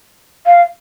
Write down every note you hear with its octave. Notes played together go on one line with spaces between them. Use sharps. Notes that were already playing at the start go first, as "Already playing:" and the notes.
F5